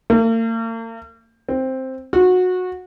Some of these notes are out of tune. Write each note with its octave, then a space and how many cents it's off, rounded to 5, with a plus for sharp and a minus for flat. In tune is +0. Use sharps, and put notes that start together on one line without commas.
A#3 -45
C4 +5
F#4 -20